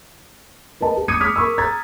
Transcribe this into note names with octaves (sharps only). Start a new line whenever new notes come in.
A#4 B4 D#5 A5
G4
D6 D#6 G#6 C#7 D#7
D6 D#6 F6 G#6 B6
A#4 C#6 E6
A#5 G#6 A6